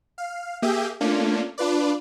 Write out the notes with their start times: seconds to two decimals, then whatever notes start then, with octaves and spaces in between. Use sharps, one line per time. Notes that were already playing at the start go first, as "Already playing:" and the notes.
0.18 F5
0.62 A#3 G4 G#4 E5 G6 D#7
1.01 A3 A#3 C#4 D4 F4
1.58 D4 F4 B4 D5